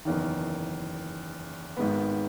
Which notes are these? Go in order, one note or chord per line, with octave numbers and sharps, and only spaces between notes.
F#1 E2 D#3
G#1 G#2 D#3 G#3 B3